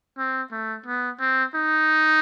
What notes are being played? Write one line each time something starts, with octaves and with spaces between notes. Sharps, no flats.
C4
A3
B3
C4
D#4